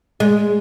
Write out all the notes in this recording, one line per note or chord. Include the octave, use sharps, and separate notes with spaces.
G#3